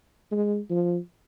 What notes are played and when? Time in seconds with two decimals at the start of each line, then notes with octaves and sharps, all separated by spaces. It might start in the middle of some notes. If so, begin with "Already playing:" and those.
0.32 G#3
0.70 F3